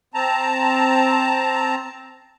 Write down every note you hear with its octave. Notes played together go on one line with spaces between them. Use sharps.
C4 A5 A#5